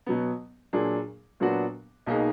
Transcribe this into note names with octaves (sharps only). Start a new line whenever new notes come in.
B2 F#3 B3
A#2 F#3 D4 G#4
A#2 F#3 B3 D4 F#4
B1 B2 A#3 D#4 G#4